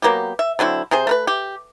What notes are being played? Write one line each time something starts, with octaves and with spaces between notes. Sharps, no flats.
F#3 A#3 B3 G4
E5
D3 F#3 C4 E4
C3 G#4 C5
A3 A#4 B4
G4